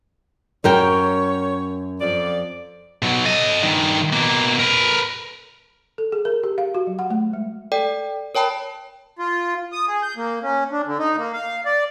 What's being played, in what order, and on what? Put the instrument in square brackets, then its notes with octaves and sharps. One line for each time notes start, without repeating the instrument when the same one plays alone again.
[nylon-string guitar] F#2 A#4 G5 [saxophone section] C#5
[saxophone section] F2 D5
[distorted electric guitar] B2 F#3
A4 D#5
G2 D#3
B2 A#3
A#4 B4
[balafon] A4
G#4
A#4
G4
F5
F#4
F#3
F#5
A3
G#3
[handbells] A4 D5 G5
A#4 C#5 G5 A5 B5
[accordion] F4
D#6
G#4
G6
A#3
C#4
D4
D3
D#4
A#3
F5
D5